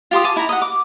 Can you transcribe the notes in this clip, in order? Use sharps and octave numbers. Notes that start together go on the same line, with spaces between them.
F4 G4 C6 D#6
G#5 A5 D6
E4 A#5
D#5 E5 F#5
D6